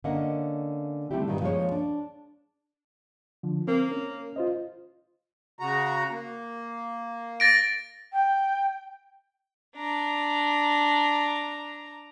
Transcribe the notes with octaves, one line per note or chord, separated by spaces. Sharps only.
D3 A#3 C#4 A#4 D#5 F#5
D3 G3 A3 C4 E4 G4
G2 A#2 D#3 G3
F3 G#3 A#3 C#4 C5 C#5
D4
D3 F3
A#3 C4
C#4
F4 C5 D#5
C#3 F#4 A#5
A#3
A6 A#6 D7
G5
D4 A#5